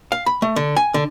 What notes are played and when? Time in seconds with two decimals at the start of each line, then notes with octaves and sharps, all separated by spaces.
0.12 F5
0.26 B5
0.42 A3
0.56 D3
0.76 G#5
0.94 D3